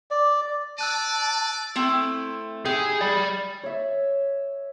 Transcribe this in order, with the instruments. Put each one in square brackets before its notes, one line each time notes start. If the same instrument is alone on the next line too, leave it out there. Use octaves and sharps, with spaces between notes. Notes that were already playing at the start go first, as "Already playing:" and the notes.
[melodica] D5
[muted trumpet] D5 [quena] A5 [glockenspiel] E6 F#6 D#7
[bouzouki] A3 C4 E4
[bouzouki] D#4 E4 G4 [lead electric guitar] G#4
[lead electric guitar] D5 B5
[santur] C#5 E5